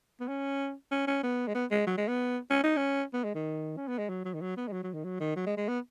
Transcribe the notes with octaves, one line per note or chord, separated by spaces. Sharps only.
B3
C#4
C#4
C#4
B3
G#3
B3
G#3
F#3
G#3
B3
C#4
D#4
C#4
B3
G#3
D#3
C#4
B3
G#3
F#3
F#3
D#3
F#3
B3
G#3
F#3
F#3
D#3
F#3
D#3
F#3
G#3
G#3
B3